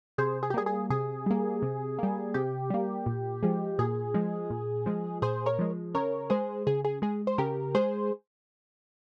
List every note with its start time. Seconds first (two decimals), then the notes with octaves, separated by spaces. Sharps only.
0.18 C3 G#4 C5
0.43 G#4
0.50 G4
0.54 G3 A#3 G#4
0.66 G#4
0.90 C3 G#4
1.26 G3 A#3
1.62 C3
1.99 G3 A#3
2.34 C3 G4
2.70 G3 A#3
3.06 A#2
3.43 F3 G#3
3.79 A#2 G#4
4.14 F3 G#3
4.50 A#2
4.86 F3 G#3
5.22 A#2 G#4 C5
5.46 A#4 C#5
5.59 F3 G#3
5.94 C#3 A#4 C#5
6.30 G#3 G#4 C5
6.67 C#3 G#4
6.85 G#4
7.02 G#3 G#4
7.27 C5
7.38 C#3 G4 A#4
7.75 G#3 G#4 C5